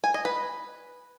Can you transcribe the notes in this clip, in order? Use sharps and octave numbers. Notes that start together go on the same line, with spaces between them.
G#5
D#5
B4